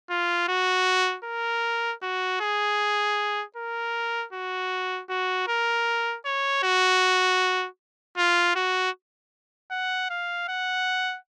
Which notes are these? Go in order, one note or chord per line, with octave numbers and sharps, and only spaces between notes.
F4
F#4
A#4
F#4
G#4
A#4
F#4
F#4
A#4
C#5
F#4
F4
F#4
F#5
F5
F#5